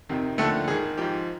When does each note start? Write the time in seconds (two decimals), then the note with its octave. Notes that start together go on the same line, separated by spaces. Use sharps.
0.09 F2 C3 D#3
0.38 D#2 D3 F3 A3 A4
0.68 G#2 D#3 G#4
0.98 G#2 F3 G4